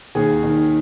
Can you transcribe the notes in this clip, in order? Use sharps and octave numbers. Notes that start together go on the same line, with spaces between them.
D#2 G#4
D#3